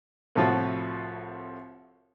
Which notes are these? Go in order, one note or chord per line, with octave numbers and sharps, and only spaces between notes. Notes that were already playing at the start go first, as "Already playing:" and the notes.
C2 A2 F3 F4 F#4